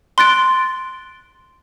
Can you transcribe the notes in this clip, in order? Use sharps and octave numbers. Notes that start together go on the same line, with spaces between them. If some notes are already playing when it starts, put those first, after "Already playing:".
C6 F#6 A6 D7